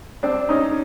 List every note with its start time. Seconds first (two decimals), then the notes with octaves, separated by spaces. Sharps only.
0.23 C4 D4
0.49 C#4 D#4